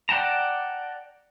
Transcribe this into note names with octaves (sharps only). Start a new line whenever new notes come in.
D5 F#5 G5 A5 A#5